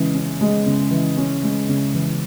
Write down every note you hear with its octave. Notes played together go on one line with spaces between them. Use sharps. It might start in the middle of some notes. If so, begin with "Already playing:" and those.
Already playing: C#3 E3 G#3 C#4
C#4
G#3
C#3
E3
C#4
G#3
C#3
E3